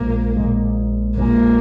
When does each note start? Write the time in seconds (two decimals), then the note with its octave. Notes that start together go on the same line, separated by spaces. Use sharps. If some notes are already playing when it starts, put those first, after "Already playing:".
Already playing: A#1 A#2 G#3 A#3
0.37 A#1 A#2 G#3
1.17 A#1 A#2 G#3 A#3